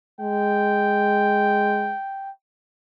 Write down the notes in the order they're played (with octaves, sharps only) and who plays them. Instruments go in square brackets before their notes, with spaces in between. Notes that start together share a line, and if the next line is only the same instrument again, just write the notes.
[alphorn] G#3 [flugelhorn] G5